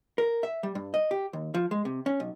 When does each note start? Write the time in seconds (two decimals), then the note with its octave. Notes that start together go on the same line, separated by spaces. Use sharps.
0.18 A#4
0.43 E5
0.63 G3
0.75 G2
0.94 D#5
1.11 G4
1.33 D#2
1.54 F3
1.71 G#3
1.85 C3
2.06 C#4
2.20 B1